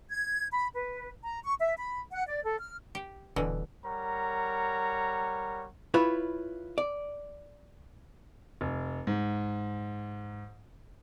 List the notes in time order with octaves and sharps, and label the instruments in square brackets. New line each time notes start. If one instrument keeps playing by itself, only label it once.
[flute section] G#6
B5
B4
A#5
C#6
E5
B5
F#5
D5
A4
F6
[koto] G4
[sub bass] D#1 [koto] B2 D3 E3
[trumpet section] G3 A#4 C#5 F#5 A#5
[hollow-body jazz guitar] E4 F4 B4 C#5
D5
[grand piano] F1
G#2